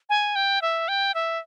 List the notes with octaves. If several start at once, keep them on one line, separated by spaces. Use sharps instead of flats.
G#5
G5
E5
G5
E5